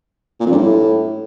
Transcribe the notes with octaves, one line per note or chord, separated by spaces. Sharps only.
A#2
F2
G2
A2